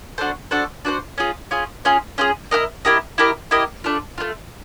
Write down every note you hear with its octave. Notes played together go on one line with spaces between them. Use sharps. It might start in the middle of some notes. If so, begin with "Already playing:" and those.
D4 F#4 A4 C5
D4 F#4 A4 C5
D4 F#4 A4 C5
C#4 F4 G#4
C#4 F4 G#4
C#4 F4 G#4
C#4 F4 G#4
E4 G4 A#4 D#5
E4 G4 A#4 D#5
E4 G4 A#4 D#5
E4 G4 A#4 D#5
A3 D4 F4
A3 D4 F4